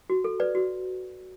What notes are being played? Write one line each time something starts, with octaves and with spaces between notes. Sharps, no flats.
F#4
A4
B4 D5
F#4